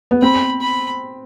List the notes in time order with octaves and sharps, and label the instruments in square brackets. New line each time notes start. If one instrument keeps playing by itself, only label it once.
[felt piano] B3
[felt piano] C4 [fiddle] B5
[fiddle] B5